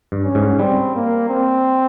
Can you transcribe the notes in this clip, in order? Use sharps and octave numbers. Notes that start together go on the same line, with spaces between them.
G2
C#4
G#2
G3 C4
A#3
C4